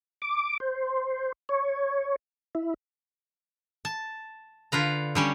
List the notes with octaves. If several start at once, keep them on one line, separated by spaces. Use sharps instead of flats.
D6
C5
C#5
E4
A5
D3 F4 B4 A#5
D3 G3 C#4